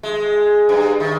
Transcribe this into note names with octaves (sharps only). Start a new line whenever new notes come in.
G#3
G2
D#3